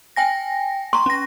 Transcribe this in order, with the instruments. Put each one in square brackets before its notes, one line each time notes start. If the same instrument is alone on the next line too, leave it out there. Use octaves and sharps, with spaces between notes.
[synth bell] G5 G#5 A#6
[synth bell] A#5 C#6 [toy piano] C6
[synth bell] C#4 A#6